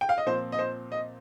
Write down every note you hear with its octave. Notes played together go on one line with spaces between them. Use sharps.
G5
F5
D#5
A#2 F3 C4 C5
D#5
C5
D#5